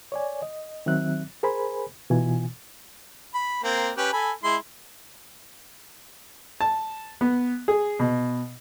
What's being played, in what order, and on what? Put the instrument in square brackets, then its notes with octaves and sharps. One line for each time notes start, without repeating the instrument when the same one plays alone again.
[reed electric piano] C#5 D5 G#5
D#5
D#3 F#3 C4 E5 F#6
G#4 A#4 C5 G#5 B5
B2 E3 F4 G#5
[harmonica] B5
A#3 C4
C#4 G4 B4
A4 G#5 B5
G#3 E4 C6
[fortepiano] A5
B3
G#4
B2